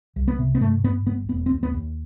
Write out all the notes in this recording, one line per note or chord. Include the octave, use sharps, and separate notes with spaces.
C2
B3
C3
B3
G2 A3
G2 B3
G1 B3
E1 B3
C4
D#2
B3
D#2